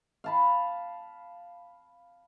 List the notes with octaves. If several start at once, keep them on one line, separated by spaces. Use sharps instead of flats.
F5 A5 B5